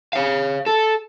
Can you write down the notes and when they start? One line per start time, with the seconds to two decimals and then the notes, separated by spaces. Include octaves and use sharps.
0.13 C#5 F5
0.66 A4